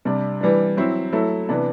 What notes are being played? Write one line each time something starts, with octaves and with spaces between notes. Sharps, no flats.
C3 G3 D4
E3 G3 D4
F#3 C4 E4
F#3 A3 E4
C3 E3 B3 D4